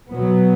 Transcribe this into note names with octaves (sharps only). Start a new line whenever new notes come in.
B2 F#3 B3